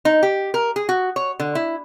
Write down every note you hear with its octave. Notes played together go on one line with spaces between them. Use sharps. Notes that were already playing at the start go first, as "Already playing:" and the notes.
D#4
G4
A#4
G#4
F#4
C#5
D3
E4